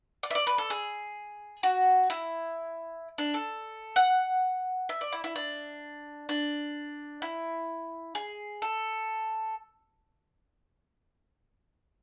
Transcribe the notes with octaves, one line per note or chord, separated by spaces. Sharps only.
D5
E5
D5
B4
A4
G#4
F#4
E4
D4
A4
F#5
E5
D5
E4
E4
D4
D4
E4
G#4
A4